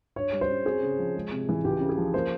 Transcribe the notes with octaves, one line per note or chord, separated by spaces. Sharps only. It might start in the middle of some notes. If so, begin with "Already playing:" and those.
G2 C#5
G3
C5
C#4
C4 G#4
C#3
F3
G#3
C3
E3
C#2 G4
C#3
G#4
F3
A#3 C5